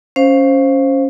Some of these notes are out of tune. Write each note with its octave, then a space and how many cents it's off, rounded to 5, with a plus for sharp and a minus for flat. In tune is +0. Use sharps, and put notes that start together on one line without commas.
C#4 +0 C5 +10 F5 +0